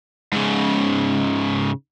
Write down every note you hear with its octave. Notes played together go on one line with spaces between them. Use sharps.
G#2 C#3